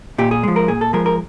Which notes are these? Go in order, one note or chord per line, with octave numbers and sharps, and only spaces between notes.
A#2 G4
G#4
F3 G#3
A#4
A#2 G#4
A4
F3 G#3 A#4
A#4